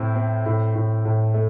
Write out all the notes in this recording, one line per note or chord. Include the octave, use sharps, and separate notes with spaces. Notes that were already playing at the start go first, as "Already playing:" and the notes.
Already playing: A2 C4 E4
C4
A2
A2
A2
A3